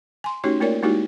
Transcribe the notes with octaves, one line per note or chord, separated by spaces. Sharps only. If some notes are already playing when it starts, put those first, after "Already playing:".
G#5 C6
A3 C#4 D#4 F#4 G4 C#5
A3 A#3 F4 A#4 C#5 D5
G#3 A#3 D#4 E4 F#4 G4